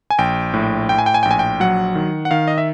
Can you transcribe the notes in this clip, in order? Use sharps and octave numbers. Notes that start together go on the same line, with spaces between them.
G#5
A#1 G5
A2
A2 G5
G#5
G5
G#5
A#1 G5
G#5
G5
F#3 F#5
D#3
F#5
D#3 F5
D#5
E5